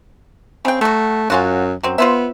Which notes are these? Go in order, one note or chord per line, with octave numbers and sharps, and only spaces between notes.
C#3 C4 G5
F#3 A3 F#4
F#2 C#4 F4 F#4
F#2 F#3 C4
B3 F4 C5 E5